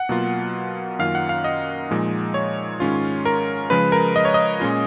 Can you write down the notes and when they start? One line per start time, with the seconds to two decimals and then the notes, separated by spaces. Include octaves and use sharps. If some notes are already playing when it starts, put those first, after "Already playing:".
Already playing: F#5
0.09 B2 F#3 A#3 F4
0.99 F#2 D#3 A#3 C#4 F4 F5
1.15 F#5
1.29 F5
1.44 D#5
1.90 A#2 F3 G#3 D#4
2.34 C#5
2.80 G#2 D#3 G#3 C#4 F4
3.25 A#4
3.70 C#3 F3 G#3 B4
3.92 A#4
4.16 D#5
4.25 C#5
4.34 D#5
4.60 A#2 G#3 C#4 F4